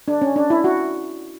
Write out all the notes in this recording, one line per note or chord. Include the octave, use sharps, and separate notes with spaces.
D4
C#4
D4
E4
F#4